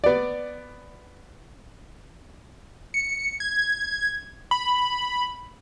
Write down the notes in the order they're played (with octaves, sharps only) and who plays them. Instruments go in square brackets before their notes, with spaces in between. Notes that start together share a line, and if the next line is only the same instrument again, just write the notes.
[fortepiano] B3 D5
[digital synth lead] C#7
G#6
B5